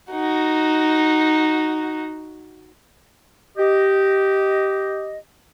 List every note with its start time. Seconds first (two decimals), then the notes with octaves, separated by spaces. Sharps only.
0.12 D#4 F#4
3.58 G4 D#5